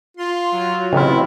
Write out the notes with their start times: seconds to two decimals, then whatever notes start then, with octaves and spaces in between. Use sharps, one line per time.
0.17 F4 C6
0.52 F#3
0.93 A1 C#3 C4 E4 F4